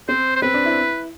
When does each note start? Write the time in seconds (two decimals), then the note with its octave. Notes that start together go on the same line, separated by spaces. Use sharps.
0.09 C4 C5
0.36 C5
0.42 C4 B4
0.54 D4
0.65 E4